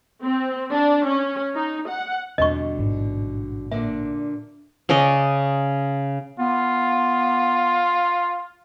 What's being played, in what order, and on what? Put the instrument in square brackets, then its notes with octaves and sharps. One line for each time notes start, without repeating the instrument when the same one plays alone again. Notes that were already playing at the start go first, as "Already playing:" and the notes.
[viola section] C4
D4
C#4
D#4
F#5
[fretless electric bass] E2 C4 [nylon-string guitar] B2 D3 G3 [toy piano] D#5 C#6
[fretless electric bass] A1 G#2
[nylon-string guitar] A#2 D3 D4 [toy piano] E5
[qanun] C#3 C#4 D5 D#5
[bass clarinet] B3 [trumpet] F4